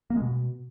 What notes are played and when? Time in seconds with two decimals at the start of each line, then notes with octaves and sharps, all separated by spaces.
0.10 A#3
0.16 G#3
0.22 B2